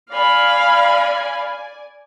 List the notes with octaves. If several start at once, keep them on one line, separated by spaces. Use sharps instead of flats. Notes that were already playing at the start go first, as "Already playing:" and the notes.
D5 F5 G#5 B5